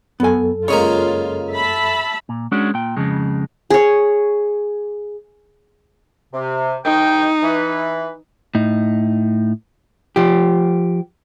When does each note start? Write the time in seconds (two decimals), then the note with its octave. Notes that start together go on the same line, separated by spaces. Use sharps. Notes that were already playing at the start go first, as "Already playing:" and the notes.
0.20 F#2 B3 A4 G#5
0.68 C#3 G#3 A#3 F4 C#5
1.51 E5 A5 B5
2.29 A#2
2.52 G#3 C#4 D4 F#4
2.74 A#2 G5
2.97 F2 C#3 G#3
3.70 G#4 C#5
6.33 C3
6.85 C2 D#3 D#4 G5
7.42 E3 B4
8.55 A2 D#4
10.16 F3 G4